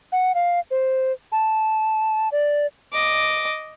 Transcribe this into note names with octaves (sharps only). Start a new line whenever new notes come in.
F#5
F5
C5
A5
D5
D#5 D6